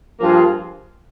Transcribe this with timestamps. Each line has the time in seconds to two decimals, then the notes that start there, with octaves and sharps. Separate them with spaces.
0.20 G2 F3 A#3 F4 G#4